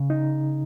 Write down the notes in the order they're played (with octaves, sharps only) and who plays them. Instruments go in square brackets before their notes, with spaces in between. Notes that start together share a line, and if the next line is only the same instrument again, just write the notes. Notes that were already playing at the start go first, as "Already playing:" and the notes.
Already playing: [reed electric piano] C#3
D#4